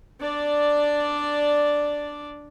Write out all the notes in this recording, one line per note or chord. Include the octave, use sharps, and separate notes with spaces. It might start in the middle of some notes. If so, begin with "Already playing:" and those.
D4 D5